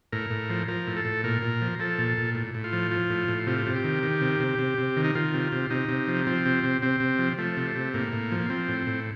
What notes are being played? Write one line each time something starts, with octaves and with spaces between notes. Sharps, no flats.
A2 A#4
A2
F3
F3 A#4
A2
A4
A2
A#2 A#4
A#2
F3
F3 A4
A#2
A#2
A2
A2
F4
F3
F3
A2
A2
C3 F4
C3
G4
D#3
D#3
C3
C3
C3
C3
D#3
D#4
D#3 F4
C3
C3
C3 D#4
C3
F3
F3 C4
C3
C3
C3 C4
C3
F3
F3 A3
C3
C3
A2 A#3
A2
F3
A#3
F3 C4
A2
A2